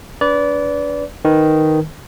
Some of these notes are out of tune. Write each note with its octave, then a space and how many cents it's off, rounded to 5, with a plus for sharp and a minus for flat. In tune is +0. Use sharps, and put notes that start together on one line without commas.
D4 -35 B4 +0 D5 -25
D#3 +0 B4 +0